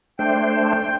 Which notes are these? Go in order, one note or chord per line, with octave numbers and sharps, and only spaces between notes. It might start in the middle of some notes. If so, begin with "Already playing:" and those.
A3 D4 C5 G5